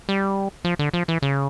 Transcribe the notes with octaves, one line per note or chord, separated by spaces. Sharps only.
G3
F3
D3
F3
E3
C#3